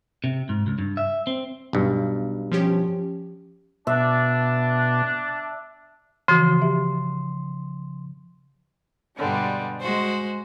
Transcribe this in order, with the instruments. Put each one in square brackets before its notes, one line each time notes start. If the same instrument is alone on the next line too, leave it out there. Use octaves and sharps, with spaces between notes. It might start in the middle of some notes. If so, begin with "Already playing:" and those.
[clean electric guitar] C3
G#2
C#2
G2
E5
C4
[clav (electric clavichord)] B1 G2
[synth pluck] F3 C#4 G4
[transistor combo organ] B2 [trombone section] D4 [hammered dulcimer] E5
[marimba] C#3 F3 [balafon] E3 F#4 [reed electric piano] C6
[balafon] G4 E5
[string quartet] G2 B2 D3 G3 G#3
G#3 F#4 C5